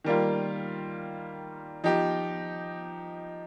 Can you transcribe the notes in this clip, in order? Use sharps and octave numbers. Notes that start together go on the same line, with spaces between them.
D#3 G3 A#3 F4
F3 D#4 G4